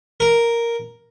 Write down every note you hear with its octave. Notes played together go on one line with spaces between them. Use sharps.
A#4